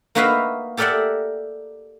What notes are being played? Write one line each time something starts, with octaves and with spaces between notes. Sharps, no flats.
A#3 D#4 F#4 B4 E5 F5
G4 A4 A#4 D5 E5 F#5